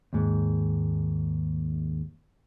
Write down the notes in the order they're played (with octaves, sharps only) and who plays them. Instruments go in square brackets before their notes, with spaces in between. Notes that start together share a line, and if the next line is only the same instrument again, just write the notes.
[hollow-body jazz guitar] D#2 G#2